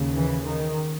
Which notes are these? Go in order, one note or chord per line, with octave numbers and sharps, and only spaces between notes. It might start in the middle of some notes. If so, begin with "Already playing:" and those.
Already playing: D#2 C#3
E3
D#3